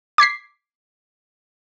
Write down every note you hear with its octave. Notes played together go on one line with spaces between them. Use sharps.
D6 G#6 B6 C7